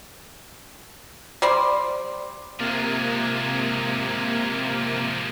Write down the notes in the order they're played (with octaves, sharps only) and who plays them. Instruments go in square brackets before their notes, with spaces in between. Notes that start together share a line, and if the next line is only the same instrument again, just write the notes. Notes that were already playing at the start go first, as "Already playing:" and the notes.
[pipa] G3 C5 D5
[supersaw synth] C3 A#3 [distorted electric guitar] F3 G#3